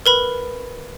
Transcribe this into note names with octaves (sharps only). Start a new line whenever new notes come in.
A#4 B4 B5